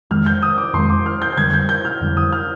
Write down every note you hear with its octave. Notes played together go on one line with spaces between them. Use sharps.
F2 D#3 G#3 F6
G6
D#6
D6
F2 D#3 G#3 C6
D6
F6
G6
G6
F2 D3 G3 G#6
G6
G6
F6
F2 D3 G3
D#6
F6